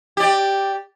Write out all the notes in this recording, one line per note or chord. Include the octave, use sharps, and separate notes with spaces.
G4 D5